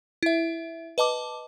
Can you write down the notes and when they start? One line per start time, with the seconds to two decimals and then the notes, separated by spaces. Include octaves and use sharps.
0.23 E4 E5
0.98 B4 D#5 A5 D6